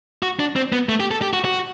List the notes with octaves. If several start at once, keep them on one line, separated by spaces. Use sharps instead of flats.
F#4
D4
C4
B3
A3
G4
A4
G4
F#4
F#4